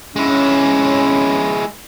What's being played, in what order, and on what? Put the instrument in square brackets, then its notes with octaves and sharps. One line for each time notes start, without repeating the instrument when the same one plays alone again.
[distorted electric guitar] G#3 E4 [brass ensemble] C#4